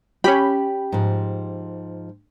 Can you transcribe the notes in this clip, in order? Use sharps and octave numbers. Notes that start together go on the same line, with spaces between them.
C#4 G4 B5
G#2 F3